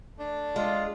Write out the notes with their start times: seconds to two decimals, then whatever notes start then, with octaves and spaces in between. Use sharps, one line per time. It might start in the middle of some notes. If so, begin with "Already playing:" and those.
0.18 A3 D4
0.56 G#3 F4